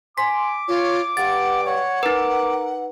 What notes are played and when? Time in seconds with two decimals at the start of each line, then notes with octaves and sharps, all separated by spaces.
0.18 G#5 C6 D6 B6
0.68 F4 C#5
1.17 G2 F#5 A6
1.66 C#5 F#5
2.03 D#4 A#4 B4 A#5 D6